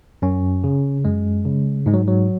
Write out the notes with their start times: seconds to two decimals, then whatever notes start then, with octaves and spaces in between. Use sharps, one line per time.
0.22 F#2 C#4
0.64 C#3
1.05 F#2 G#3
1.45 C#3
1.86 G#2 G#3
1.94 F#3
2.07 F#3